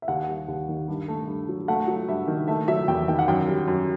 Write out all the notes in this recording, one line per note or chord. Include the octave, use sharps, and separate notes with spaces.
E5
D#2 F#5
G3
D#2
D#3
G2
A3
G2
F#3
A3 F#5
F#3
G2 E5
D#3
A3 E5
F#3 E5
E2 G5
D#3 G5
F#5
F#2 G5
G3
F#2